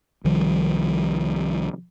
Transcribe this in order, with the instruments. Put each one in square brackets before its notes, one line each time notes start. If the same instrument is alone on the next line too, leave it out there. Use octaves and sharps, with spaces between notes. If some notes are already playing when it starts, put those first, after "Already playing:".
[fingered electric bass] C2 D#3 F3 G3